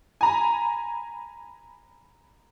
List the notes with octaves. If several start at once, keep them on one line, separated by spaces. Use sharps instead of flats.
G#5 A#5 B5